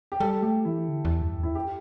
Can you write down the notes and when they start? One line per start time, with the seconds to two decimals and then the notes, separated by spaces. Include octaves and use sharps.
0.12 G4
0.20 G3 A4
0.42 A3 G4
0.65 E3 E4
0.88 D3
1.05 E2
1.22 G2
1.39 E2
1.43 E4
1.55 G4